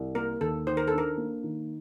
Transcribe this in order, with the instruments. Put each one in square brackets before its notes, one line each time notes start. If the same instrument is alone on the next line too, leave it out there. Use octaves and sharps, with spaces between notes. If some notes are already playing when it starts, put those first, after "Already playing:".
Already playing: [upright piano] C2
[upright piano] A#3 [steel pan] A#4
[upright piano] D#2 [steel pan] A4
[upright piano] D#3 [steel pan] C5
[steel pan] A#4
A4
[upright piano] D4
[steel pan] A#4
[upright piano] A#3
D#3